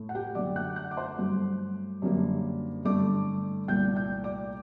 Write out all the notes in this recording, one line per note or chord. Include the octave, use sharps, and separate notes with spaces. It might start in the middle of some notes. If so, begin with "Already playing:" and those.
Already playing: A2 A3
F#5
G4 G5
F#2 D3 A3 D5 D6
F#5 F#6
F#5 F#6
D6
C5 C6
G2 F#3 A3
F#2 D3 G3 A#3
G2 D3 A3 D5 D6
C2 A#2 A3 G5 G6
G5 G6
D5 D6